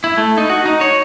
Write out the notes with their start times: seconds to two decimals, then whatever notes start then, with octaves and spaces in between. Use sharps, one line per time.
0.04 E4
0.18 A3
0.38 D#4
0.49 F#4
0.66 D#4
0.81 C#5